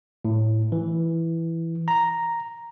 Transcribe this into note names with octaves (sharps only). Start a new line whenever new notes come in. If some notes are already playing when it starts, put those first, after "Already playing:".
A2
E3
A#5